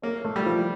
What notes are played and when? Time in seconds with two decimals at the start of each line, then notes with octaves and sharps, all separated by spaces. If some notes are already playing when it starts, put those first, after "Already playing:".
0.02 A#3 C#4
0.25 A3
0.36 G3
0.46 F3